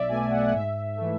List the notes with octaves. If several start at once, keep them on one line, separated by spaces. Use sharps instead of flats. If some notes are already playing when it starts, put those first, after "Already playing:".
Already playing: B1 D5 E5
B2 A3 G#5
F#5
F#5
G#2 E5
E3 A3